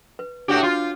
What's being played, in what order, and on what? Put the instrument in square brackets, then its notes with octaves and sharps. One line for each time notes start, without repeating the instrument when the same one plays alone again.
[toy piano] B4
[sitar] A2 F#4 G4 [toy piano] D4 C#5
[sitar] F4 [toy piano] F#4